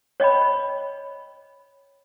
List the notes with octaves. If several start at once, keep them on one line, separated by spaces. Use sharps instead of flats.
C#5 D#5 G5 B5